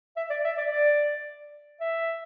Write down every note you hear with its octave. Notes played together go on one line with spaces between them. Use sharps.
E5
D5
E5
D5
D5
E5